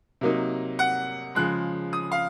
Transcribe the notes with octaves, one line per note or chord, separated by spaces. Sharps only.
C3 F#3 A#3 D#4
F#5
C#3 F3 G#3 F#6
D#6
F5